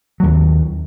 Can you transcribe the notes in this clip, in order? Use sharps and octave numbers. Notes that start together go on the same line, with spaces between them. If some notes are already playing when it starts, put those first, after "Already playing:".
D#2 F#3